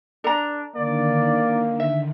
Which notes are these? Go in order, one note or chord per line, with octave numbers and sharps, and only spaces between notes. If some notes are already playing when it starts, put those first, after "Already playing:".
D4 A4 A#5
D3 D#3 A#3 D5
E5